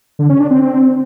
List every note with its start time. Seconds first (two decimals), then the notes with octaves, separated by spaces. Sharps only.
0.19 D3
0.30 C#4
0.40 D4
0.51 C4